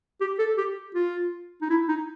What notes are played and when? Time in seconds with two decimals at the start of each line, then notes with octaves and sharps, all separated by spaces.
0.21 G4
0.39 A4
0.58 G4
0.95 F4
1.62 D#4
1.70 E4
1.89 D#4